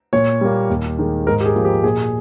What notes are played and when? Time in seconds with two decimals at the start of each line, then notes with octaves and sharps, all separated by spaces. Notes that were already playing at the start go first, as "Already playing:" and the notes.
0.13 A#2 C#5
0.41 G3 A#3
0.70 D#2
0.99 D#3 G#3
1.27 G#2 A#4
1.41 G4
1.46 G#4
1.56 F3 A#3
1.65 G4
1.84 A#2 G#4